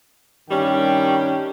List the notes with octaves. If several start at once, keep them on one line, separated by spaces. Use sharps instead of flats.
G2 D#3 G3 C#4 G5